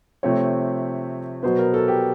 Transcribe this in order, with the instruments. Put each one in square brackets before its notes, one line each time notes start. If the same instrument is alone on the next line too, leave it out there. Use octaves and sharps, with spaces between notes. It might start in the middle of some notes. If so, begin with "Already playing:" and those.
[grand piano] C3 F3 A3 C4 C#5
B2 F#3 B3 C5
A#4
A4
G4